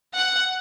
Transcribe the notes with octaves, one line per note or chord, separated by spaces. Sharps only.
F#5